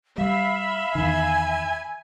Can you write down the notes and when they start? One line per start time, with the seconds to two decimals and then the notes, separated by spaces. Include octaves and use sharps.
0.18 G3 E5 F5 B5
0.95 E2 D#3 G#5